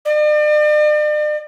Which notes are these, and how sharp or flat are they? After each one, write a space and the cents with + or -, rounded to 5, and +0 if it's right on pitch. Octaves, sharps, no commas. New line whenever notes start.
D5 +40